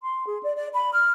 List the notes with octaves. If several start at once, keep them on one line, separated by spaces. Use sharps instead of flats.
C6
G#4
D5
D5
B5
F6